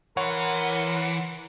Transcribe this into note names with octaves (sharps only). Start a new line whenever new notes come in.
E3 A#4 C#5 F#5 C6